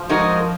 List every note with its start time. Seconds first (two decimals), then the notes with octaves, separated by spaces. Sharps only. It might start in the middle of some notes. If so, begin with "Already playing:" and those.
Already playing: F3
0.09 G#3 D#4 F#4 A#4